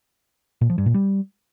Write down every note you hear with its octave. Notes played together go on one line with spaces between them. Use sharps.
A#2
F3
G2
A#2
G3